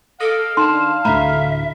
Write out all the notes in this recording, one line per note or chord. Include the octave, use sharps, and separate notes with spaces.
A4 D#5 F5 D6
D#3 D4 A5 C6
D2 A2 E5 A#5 B5